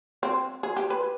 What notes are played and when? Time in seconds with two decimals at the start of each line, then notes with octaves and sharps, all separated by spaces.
0.23 C4
0.63 G#4
0.77 G4
0.90 B4